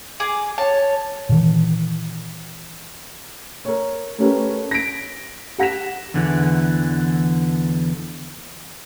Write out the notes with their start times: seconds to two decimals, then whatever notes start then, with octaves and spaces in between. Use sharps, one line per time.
0.20 G#4 D6
0.58 C#5 A5
1.29 A#2 D#3 E3
3.65 A#4 C#5
4.18 A3 C#4 G4 A#4 B4
4.71 A#6 B6 D7
5.58 G4 F#5 A#6 B6 E7
6.14 E2 D3 E3